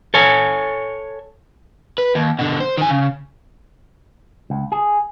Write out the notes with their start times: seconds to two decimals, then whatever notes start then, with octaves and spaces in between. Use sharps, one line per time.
0.14 A4 C#5 G#5
1.98 B4
2.15 D#2
2.39 B2 D3
2.60 C5
2.78 D#3 G#5
2.89 C#3
4.50 C#2
4.72 G#4